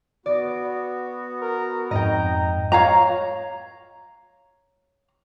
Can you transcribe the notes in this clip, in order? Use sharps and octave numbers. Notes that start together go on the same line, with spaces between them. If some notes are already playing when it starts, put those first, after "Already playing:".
B3 F#4 D5
A#4
F2 G#2 D#5 G5 A#5
C#5 F5 A#5